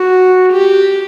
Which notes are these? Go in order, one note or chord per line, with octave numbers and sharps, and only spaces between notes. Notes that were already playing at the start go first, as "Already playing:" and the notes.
Already playing: F#4
G4